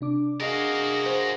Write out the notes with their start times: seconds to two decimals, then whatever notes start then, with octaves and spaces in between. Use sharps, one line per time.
0.01 C3 D4 D6
0.41 F#4 G#4 A#4 D#5 F5
1.06 C5